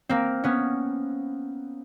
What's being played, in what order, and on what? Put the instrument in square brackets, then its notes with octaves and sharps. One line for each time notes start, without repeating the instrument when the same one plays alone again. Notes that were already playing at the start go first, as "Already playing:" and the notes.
[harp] A#3 C4
B3 C#4